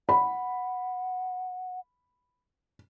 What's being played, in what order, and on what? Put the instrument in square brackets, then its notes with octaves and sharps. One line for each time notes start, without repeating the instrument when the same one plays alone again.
[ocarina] F#5 [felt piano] B5